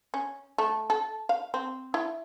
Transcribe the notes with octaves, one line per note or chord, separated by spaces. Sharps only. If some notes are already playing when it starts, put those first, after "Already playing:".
C#4
A3
A4
F5
C4
E4